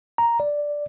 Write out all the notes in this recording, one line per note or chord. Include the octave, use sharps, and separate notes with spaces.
A#5
D5